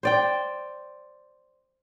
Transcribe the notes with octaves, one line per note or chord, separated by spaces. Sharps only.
C5 D5 G5